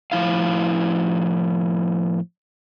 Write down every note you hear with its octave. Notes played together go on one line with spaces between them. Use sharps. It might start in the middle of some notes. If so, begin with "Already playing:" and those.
A2 F3 E4 F5